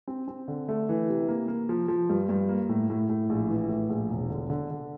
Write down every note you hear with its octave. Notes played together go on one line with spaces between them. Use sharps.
C4
C4
D3
A3
E3
C3
A#3
A#3
F3
F3
G2
G2
A#3
A2
A2
A2
A#1
E3
A2
A#1
E1
D3
D3
D3